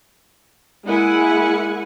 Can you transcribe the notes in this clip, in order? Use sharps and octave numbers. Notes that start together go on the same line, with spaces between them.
G#3 A#3 E4 F#5 G#5